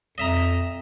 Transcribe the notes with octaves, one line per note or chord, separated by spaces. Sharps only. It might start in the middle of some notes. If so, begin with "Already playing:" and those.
F2 D#5 E5 A#5